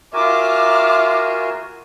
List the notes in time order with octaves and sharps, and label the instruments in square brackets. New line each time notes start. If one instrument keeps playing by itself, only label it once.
[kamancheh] F4 E5 [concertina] F#4 A#4 G#5 [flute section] D6 F6